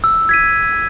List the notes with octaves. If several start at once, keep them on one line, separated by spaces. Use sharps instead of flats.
E6
G#6 B6 D#7